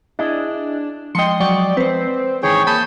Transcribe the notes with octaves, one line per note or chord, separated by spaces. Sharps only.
D4 E4 G#4 D#5
F3 G#3 D#5 G5 C6 C#7
F#3 D5 G5 C#6
C4 B4 C5
G#2 D#3 E3 G#4 C#5 G5
A#3 A5 B5 D#6 G6